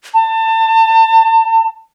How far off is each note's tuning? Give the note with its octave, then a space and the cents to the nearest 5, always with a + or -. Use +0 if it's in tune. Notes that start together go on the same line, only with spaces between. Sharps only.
A5 +30